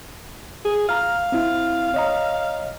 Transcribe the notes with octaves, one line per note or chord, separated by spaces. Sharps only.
G#4
F5 A#5 F6
C4 E4
C#5 D#5 A#5